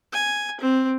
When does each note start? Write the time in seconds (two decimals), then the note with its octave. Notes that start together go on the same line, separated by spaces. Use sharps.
0.13 G#5
0.61 C4